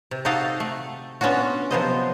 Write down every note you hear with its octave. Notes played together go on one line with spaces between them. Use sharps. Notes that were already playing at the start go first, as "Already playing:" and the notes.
C3
D#4 F#4 G4 A4 D#5 F5
A3
B3 C#4 D4 F4 F#4
C3 F3 F#3 B3 C5 D#5